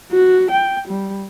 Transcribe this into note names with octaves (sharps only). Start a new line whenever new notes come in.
F#4
G5
G3